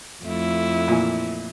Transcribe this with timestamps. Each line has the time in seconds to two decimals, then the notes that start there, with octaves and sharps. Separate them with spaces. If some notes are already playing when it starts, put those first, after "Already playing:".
0.24 F2 A3 E4
0.88 A#2 E3